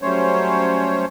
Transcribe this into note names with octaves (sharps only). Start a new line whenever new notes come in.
F#3 G3 A3 C#4 C5 C#5